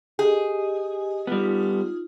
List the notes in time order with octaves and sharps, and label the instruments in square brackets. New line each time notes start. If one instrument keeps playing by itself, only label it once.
[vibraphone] G4 D#5 G#5 [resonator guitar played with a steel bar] G#4
[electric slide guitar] G3 B3 [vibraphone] D#4 F4